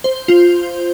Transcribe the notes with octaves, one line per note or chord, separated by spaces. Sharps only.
C5
F4